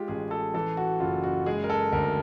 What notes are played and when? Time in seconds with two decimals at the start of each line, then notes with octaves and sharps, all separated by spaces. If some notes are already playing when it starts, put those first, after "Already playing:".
Already playing: G#3 F4 G4
0.08 A1 G#4
0.31 A4
0.54 E3 A4
0.77 F#4
1.00 F#1 F4
1.24 F#4
1.46 G#3 G#4
1.64 A#4
1.70 A4
1.92 D2 A#4